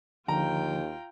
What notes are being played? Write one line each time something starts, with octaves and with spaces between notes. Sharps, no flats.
D#2 D3 F3 F4 G5 A#5